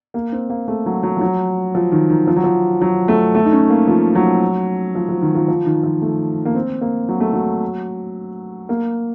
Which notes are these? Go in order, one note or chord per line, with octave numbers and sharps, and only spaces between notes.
A#3
C4
A#3
A3
F#3
F#3
F3
F#3
F3
D#3
D#3
F3
F#3
F3
F#3
A3
A3
D#4
C#4
A#3
F3
F#3
F3
F3
D#3
F3
F3
D#3
F3
A3
A#3
C4
A#3
F#3
A3
F#3
A#3